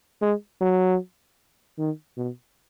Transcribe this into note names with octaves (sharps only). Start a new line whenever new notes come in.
G#3
F#3
D#3
B2